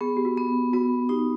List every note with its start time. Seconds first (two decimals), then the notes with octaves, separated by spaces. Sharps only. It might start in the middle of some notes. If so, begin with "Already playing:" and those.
0.01 B3 G#4
0.17 G4
0.25 F#4
0.37 B3
0.73 B3 F#4
1.09 D#4 G4